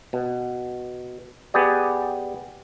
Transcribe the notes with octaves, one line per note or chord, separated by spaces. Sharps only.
B2
B3 G4 G#4 D5